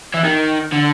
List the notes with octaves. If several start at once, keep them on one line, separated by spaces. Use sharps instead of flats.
E3
D#3
D3